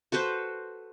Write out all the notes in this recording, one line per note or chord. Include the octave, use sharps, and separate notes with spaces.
F#4 A4 B4 C5